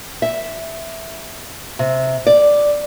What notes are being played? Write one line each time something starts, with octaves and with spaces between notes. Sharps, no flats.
E5
C3
D5